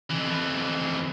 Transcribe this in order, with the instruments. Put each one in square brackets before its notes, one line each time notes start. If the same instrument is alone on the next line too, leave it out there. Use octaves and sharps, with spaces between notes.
[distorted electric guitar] F2 E3